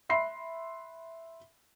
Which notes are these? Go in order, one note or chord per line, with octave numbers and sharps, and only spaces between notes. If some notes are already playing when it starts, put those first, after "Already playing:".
E5 B5 C6 C7